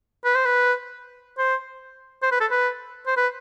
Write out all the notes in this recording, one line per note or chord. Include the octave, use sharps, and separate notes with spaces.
B4
C5
B4
C5
C5
B4
A4
B4
C5
B4